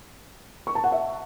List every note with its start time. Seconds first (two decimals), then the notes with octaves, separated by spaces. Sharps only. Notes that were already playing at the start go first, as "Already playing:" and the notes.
0.67 C#6
0.75 A5
0.84 F#5
0.92 E5